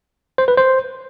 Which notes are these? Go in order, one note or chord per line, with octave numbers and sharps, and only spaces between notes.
C5
B4
C5